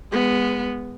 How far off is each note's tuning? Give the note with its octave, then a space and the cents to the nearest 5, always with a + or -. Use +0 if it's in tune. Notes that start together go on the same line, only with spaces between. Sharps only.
G#3 -25 B3 +0